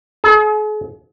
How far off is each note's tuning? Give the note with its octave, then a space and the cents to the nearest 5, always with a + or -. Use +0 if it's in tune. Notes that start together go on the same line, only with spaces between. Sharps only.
G#4 +45